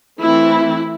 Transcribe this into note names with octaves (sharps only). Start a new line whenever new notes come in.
E3 A3 C4 E4